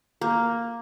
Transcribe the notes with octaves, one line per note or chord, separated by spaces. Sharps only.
A#3